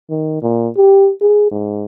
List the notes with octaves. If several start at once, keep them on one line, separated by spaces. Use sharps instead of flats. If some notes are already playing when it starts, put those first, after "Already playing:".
D#3
A#2
G4
G#4
G#2